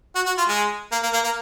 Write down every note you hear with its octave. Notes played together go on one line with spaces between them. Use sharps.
F#4
F#4
F4
G#3
A#3
A#3
A#3
A#3